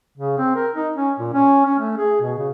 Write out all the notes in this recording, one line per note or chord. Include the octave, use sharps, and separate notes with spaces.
C#3
C4
A#4
D#4
C#4
A#2
C#4
C#4
A3
G#4
B2
C#3